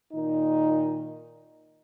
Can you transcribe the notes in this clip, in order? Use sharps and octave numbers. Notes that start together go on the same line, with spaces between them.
A#2 D#3 D#4